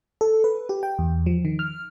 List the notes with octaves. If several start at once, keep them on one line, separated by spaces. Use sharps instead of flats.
A4
B4
G4
G5
E2
F3
D#3
F6